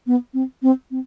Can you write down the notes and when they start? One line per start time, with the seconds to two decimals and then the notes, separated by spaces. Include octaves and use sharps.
0.07 B3
0.34 C4
0.63 C4
0.91 C4